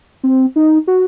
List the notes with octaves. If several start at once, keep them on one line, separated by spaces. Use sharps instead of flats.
C4
D#4
F#4